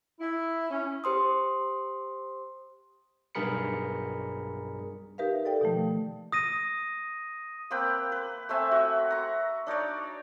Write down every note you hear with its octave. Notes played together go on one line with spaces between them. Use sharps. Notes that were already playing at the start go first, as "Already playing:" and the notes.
E4
C#4
G4 C5 C6 D#6
B1 G2 G#4 A#4 B5 C#7
D#4 G4 A#4 B4 E5 F5
A4 D5 G5
B2 D#3 F3 A3
D#6 A#6 D#7
A#3 C4 B4 G5
B4
A3 C4 E5 G#5
F#4
A#5 C#6
D4 D#4 C#5 D5